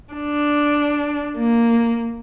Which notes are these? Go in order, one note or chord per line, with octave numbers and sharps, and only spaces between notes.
D4
A#3